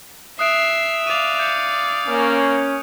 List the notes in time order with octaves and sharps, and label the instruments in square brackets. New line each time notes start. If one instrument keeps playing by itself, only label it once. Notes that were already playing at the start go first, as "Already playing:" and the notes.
[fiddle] E5 [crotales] D#6 F#6 D7 [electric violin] C7
[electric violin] D5 F5 [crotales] D#7 F7
[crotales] G6 C#7
[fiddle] A#3 [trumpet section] C#4